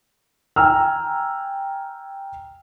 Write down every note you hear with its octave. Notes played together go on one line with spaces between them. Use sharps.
G5 G#5 A#5 E6 F6